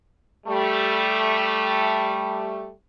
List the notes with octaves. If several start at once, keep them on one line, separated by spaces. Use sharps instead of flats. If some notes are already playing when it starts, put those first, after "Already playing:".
G3 A3